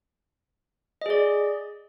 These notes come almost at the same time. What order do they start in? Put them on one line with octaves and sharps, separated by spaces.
D#5 G#4 D5